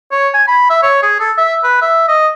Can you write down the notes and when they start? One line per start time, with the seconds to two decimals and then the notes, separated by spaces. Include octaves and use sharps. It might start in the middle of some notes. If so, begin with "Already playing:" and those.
0.12 C#5
0.34 G#5
0.48 B5
0.70 E5
0.83 C#5
1.02 G#4
1.20 A4
1.38 E5
1.64 B4
1.82 E5
2.08 D#5